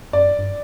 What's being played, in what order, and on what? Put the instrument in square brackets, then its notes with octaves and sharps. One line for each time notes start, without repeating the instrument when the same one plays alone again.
[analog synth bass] F#2 [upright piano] D5
[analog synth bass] G2